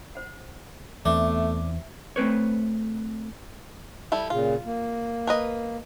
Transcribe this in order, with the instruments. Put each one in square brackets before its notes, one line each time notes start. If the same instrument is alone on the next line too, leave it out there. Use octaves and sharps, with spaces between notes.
[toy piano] C5 F#5
[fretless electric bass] E2 B3 C4 [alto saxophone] A3 [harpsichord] D4 [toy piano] E5
[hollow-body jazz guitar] A3 C4 B4 C#5
[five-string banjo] G3 E4 A4
[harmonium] A#2 C#3 [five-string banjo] F4
[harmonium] A#3
[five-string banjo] A#4 B4 D#5